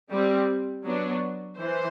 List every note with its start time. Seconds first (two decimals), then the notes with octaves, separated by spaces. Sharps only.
0.11 G3 C4
0.85 F#3 B3 D4
1.58 E3 C5